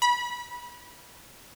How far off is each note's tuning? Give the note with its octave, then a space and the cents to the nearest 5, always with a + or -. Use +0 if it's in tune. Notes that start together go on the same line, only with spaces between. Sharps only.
B5 -25